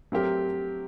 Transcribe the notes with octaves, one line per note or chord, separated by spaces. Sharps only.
F#3 A3 C4 G4 A#4